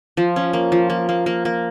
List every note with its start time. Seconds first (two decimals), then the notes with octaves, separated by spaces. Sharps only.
0.17 F3
0.36 C#4
0.53 A#3
0.72 F3
0.90 A#3
1.09 A#3
1.26 A#3
1.45 A#3